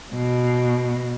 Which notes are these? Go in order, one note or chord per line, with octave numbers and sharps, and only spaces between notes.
B2